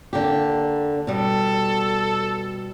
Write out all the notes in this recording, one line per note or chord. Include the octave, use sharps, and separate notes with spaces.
D3 A#3 G4
B2 G3 A4